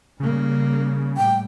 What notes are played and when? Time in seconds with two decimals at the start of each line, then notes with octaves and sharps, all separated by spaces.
0.20 C#3 G3 A#3
1.17 A2 G3 G5